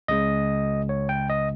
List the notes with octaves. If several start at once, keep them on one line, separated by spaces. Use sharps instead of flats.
C#2 C#3 G#3 D#5
C#5
G5
D#5